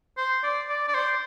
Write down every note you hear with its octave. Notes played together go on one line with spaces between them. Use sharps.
C5
D5
D5
D5
C5